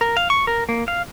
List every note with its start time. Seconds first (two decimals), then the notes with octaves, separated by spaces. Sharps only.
0.01 A#4
0.17 F5
0.30 C#6
0.47 A#4
0.69 A#3
0.88 F5